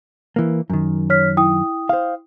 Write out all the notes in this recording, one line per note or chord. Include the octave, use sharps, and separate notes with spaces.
E3 A#3
F#2 D#3
C#5 F6 B6
E4 G5 D#6
C5 F5